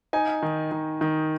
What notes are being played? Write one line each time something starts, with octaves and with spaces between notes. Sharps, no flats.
D#4 G#5
D#3
D#3
D#3